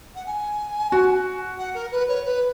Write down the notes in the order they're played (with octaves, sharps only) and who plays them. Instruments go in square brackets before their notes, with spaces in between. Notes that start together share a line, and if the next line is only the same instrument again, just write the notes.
[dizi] F#5
G#5
[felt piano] F#4
[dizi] F#5
A#4
B4
C#5
B4